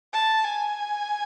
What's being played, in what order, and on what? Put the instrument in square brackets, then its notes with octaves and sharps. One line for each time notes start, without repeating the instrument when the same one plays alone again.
[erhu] A5
G#5